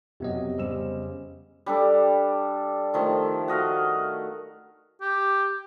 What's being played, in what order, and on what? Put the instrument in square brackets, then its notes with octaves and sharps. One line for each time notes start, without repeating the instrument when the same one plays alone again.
[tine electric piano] F2 B3 D#5 [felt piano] C3 F#3
[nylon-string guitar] C#3 G3 [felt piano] C5 E6 E7
[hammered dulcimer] G3 D4 A4
D#3 F3 A3
F#4 D#5 F5 F#5
[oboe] G4